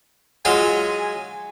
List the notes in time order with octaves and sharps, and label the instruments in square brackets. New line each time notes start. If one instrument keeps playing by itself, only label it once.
[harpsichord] F#3 G#3 F4 [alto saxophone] G#5